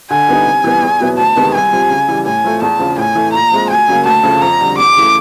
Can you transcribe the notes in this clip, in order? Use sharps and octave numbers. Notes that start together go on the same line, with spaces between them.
D3 G#5
G3 B3 D#4
C3
E3 G3 B3
E2
B2 F#3 B3 E4
D2 A5
C3 D#3 G#3 B3
C2 G#5
C3 F3
C#3
E3 G3
A2 G#5
F3 A3
E2 A5
C#3 F3
A2 G#5
E3 A3
A#2 A#5
F3 G#3 C4 F4
D2 G#5
C#3 F#3 A#3
D2 A5
C#3 F3 A3
F2 A#5
D3 G3
E2 D6
C#3 E3 A3